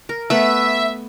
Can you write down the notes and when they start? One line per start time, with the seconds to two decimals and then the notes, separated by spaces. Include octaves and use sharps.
0.09 A#4
0.30 A3 B3 E5